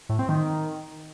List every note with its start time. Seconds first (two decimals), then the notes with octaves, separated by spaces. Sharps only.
0.09 A2
0.19 C4
0.29 D#3